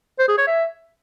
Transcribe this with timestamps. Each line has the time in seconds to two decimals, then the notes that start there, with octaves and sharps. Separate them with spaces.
0.19 C5
0.28 G#4
0.38 C#5
0.47 E5